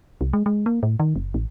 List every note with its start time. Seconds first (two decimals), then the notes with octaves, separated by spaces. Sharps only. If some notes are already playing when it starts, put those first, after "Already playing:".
0.21 C2
0.33 G#3
0.46 G#3
0.66 A#3
0.83 A2
1.00 D#3
1.16 F#1
1.34 A1